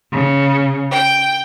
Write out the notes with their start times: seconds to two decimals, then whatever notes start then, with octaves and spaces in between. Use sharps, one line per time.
0.12 C#3
0.92 G5